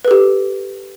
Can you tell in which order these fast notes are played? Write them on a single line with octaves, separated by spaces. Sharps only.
B4 A4 G4